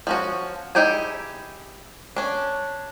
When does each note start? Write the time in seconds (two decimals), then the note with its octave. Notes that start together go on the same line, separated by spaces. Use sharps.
0.07 F3 C#4 F#4
0.75 D#4 E4 G4 G#4 G#5
2.17 C#4 D4